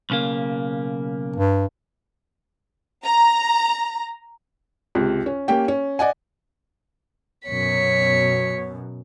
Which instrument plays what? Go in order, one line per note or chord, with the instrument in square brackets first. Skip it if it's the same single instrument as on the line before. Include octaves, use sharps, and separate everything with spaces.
[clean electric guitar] B1 C#3 A#3
[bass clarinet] G2
[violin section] A#5
[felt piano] C#2 C3
C#4
A#3 C#4 G4 G5
C#4
D5 D#5 F#5 G#5
[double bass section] F#2 B2 [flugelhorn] C#5 [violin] B6 C#7